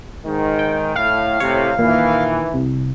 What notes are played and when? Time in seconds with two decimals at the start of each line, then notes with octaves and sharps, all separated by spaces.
0.25 G#2 D#3
0.59 G5
0.95 A2 F5
1.40 A2 C3 C#5
1.79 A#2 D#3 E3
2.54 C2